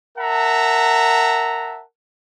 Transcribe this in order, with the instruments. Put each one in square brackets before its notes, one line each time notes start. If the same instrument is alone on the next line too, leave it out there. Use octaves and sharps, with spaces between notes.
[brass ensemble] A#4 E5 F#5 A5 A#5